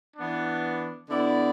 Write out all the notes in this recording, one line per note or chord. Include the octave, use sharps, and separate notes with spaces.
E3 B3 D4
D3 B3 E4 D5